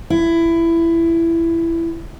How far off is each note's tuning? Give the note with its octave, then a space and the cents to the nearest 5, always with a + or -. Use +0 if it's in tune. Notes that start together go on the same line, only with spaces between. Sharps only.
E4 +15